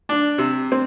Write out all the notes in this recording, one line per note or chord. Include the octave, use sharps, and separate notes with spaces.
D4
C3
C4